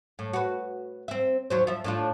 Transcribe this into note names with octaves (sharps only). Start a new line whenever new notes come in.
A2
F#4 B4
C4 E5
D#2 F#3 C5
F3 E5
A2 D4 F4